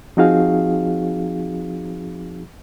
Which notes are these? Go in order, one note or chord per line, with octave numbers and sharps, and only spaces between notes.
F3 C4 D#4 F#4 G#4 F5